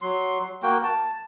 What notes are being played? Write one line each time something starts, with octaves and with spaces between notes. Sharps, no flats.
F#3 C6
A#3 F#4 G5
A5